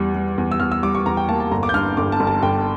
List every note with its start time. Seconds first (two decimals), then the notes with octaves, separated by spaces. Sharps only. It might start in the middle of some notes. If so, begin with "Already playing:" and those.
Already playing: E2 G3
0.15 G3
0.38 E2
0.52 E6
0.60 E2 F6
0.72 E6
0.83 G3 D6
0.95 C#6
1.06 E2 A#5
1.17 G5
1.29 A#3 A5
1.40 A5
1.51 G1 A#5
1.63 D6
1.69 G6
1.74 G2 F6
1.97 G1 D6
2.12 A5
2.20 G1
2.27 A5
2.42 G1 G5